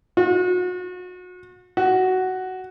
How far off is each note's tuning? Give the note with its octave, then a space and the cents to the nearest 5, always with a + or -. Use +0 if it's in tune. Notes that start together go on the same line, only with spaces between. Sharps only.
F#4 -35
F#4 +10